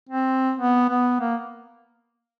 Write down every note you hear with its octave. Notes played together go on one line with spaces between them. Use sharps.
C4
B3
B3
A#3